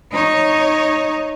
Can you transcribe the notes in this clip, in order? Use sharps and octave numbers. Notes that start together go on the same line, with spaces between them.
D#4 C#5